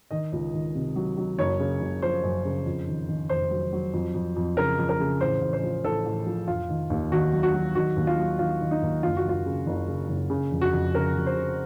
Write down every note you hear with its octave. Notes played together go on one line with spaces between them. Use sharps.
D#3 D#5
C#2
D#3
C3
F#3
F#3
F#1 C#5
C#3
F#1
F3 C5
F#2
C#3
F2
D#3
D#3
F1 C5
F#3
F#3
F2
F2
F2
C#3 A#4
F2
A#4
C#3
A1 C5
A1
C5
F3
A1 A4
A1
F3
F1 F4
D#3
D#2
D#3 F#4
F#3
F#4
F#3
D#3 F#4
D#2
F4
F#3
D#3 F4
D#3
D#4
D#2
F#1 F4
F#4
F#1 F4
C#3
F#1
C#3
F#1
C#3
F1
F#4
F2
C#3 A#4
F2
C5
C#3